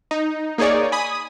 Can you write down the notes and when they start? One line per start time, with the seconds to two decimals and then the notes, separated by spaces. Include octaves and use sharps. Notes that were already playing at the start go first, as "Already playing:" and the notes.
0.11 D#4
0.58 A#3 D#4 G#4 C#5 D5
0.92 G#5 B5 D#6